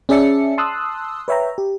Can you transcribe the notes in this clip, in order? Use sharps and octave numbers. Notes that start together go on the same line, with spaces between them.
C#4 G#4 D5 E5 A5 C#7
A5 C6 D#6 E6 F#6
B4 C#5 E5 G5 A#5
G4